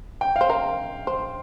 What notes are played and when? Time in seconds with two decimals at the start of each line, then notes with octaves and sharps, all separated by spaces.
0.21 G5
0.36 F5
0.41 C5
0.49 A#4 F5
1.07 C5